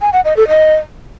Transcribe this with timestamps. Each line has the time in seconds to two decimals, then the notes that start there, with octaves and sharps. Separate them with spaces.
0.01 G#5
0.13 F#5
0.25 D#5
0.37 A4
0.48 D#5